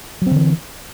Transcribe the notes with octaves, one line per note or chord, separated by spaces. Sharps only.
D3 E3 F#3 C4